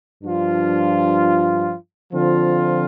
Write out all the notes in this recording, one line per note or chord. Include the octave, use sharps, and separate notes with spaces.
G2 F3 D4 F4
D3 F3 C4 F4